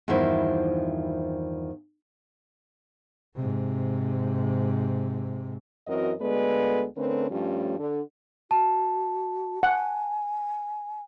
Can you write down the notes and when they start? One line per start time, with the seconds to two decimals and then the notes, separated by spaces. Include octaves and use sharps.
0.08 E2 G2 D#3 F3 E4 C5
3.35 G#2 C3
5.87 F#2 E3 C4 F#4 A#4 D#5
6.21 D2 G#3 B3 A4 B4 D5
6.97 D3 A3 C4 C#4 A#4 B4
7.30 G2 F3 G3 A3 C#4
7.79 D3
8.51 F#4 A5
9.63 F#5 G#5